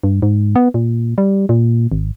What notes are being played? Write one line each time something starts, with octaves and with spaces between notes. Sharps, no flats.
G2
G#2
B3
A#2
G3
A#2
G#1